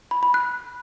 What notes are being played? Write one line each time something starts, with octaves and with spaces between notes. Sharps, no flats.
B5
B5
F#6